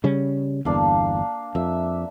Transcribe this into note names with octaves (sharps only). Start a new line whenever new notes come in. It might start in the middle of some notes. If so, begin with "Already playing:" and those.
C#3 G3 C#4
G1 E2 A#3 D4 F5
F2 E5